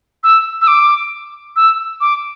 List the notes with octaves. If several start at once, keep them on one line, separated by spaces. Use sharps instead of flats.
E6
E6
D6
E6
D6